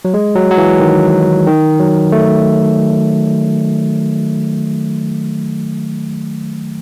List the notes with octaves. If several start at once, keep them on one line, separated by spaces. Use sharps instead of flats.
F#3
G#3
F#3
F#3
E3
D#3
D#3
F#3
A3